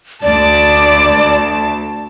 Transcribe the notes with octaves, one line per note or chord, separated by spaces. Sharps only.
D2 D5 A5